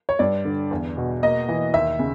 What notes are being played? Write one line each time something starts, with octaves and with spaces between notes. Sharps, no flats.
C#5
G2 D5
D3
E2
B2
A#3 D#5
E3
D#2 E5
C#3